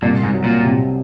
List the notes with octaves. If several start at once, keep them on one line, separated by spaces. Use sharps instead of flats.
C2 A#2
G#2
F#3
A#2
C3